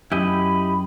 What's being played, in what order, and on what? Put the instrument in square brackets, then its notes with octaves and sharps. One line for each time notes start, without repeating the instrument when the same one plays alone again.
[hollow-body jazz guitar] F#2 [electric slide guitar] E4 G4 D#5 [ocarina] B5